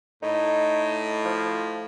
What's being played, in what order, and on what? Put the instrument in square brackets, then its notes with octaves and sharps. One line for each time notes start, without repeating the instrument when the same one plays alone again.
[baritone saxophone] A2 [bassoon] D#4
[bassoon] F3